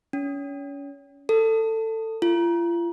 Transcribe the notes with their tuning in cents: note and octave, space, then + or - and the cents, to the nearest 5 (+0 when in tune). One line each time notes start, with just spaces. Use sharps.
C#4 +30
A4 +20
F4 -40